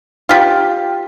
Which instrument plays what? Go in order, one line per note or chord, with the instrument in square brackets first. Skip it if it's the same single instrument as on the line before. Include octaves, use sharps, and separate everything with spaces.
[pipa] F4 G4